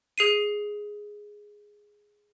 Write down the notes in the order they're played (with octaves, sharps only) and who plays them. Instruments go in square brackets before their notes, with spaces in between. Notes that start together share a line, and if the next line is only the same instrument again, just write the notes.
[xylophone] G#4 C7 D#7